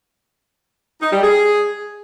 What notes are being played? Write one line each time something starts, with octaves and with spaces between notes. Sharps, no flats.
D#4
G3
G#4